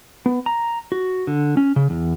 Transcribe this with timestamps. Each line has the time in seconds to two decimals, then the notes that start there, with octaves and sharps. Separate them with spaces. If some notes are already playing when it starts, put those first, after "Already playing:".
0.26 B3
0.46 A#5
0.92 F#4
1.27 D3
1.57 C#4
1.76 C#3
1.90 E2